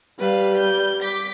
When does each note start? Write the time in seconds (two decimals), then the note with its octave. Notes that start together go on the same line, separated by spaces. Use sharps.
0.19 G3 B4 F5
0.58 G6
1.02 D6 B6